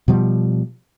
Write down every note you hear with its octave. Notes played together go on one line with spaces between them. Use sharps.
B2 F3 G3